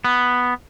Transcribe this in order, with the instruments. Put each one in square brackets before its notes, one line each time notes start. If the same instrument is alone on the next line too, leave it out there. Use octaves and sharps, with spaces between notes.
[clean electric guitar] B3